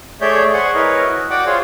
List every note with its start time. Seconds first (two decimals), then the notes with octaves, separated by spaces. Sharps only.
0.21 A3 G#4 C#5 D5 E5 G6
0.54 G#4 C5 F#5 G#5 C#6
0.74 E4 A#4 B4 C#5 D#5
1.06 F#4
1.30 F#4 D5 F#5 G5 D6
1.46 F4 G#4 C5 C#5